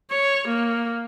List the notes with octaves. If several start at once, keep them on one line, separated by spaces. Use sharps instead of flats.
C#5
A#3